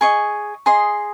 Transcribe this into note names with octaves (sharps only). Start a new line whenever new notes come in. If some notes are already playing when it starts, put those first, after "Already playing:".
G#4 D#5 C#6
G#4 D#5 C6